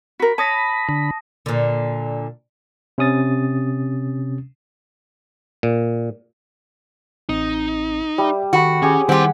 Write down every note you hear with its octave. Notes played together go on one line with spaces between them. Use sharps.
F#4 A#4 B5
C#5 A5 D#6 A#6
D3 B5
A#2 D3
C3 C#4 D#6 A6
A#2
A1 C4 D#4
G3 D5 E5
D#3 F#4 A4 B5
C#4 G4 G#4
D#3 G3 C4 E4 G4 F#5 C6